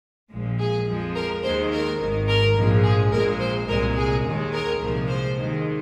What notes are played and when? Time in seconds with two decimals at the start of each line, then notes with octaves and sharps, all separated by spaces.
0.31 A#1 A#2 F3 G#3
0.59 G#4
0.87 F2 F3 G#3
1.16 A#4
1.43 D#2 D#3 G#3 C5
1.72 A#4
2.00 G#1 G#2 D#3
2.28 A#4
2.56 A#1 G#2 F3 G#3
2.84 G#4
3.11 A#1 A#2 G#3 A#4
3.40 C5
3.68 C2 A#2 G#3 A#4
3.96 G#4
4.24 D#2 D#3 G#3
4.52 A#4
4.80 C2 A#2 F3 G#3
5.08 C5
5.37 D#2 D#3 G#3